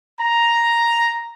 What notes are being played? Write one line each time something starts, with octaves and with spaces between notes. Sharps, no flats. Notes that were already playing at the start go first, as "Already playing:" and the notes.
A#5